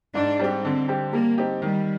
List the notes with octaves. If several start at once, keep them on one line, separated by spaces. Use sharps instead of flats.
G#2 D4
G3 C4 G4
D3 C4
G3 C4 G4
G3 A#3
C4 D#4 G4
D#3 G3